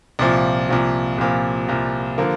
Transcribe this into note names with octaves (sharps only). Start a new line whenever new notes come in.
C2 A#2 F3
C2 A#2 F3
C2 A#2 F3
C2 A#2 F3
D3 F3 A#3